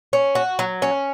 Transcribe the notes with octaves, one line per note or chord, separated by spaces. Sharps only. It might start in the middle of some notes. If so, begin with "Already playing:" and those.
C#4
F#4
F#3
C#4